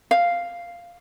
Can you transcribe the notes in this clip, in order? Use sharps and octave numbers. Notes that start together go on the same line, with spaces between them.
F5